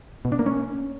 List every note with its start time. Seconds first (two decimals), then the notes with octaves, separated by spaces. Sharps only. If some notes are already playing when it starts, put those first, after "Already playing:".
0.25 B2
0.32 D4
0.39 A#3
0.46 C#4